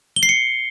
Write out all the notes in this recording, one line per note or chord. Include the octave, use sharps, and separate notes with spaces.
G7
C7
C#7